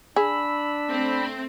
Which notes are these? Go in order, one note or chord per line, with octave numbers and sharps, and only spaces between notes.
D4 G#4 B5 E6
A3 C4